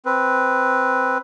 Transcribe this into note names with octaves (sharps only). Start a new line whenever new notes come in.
C4 B4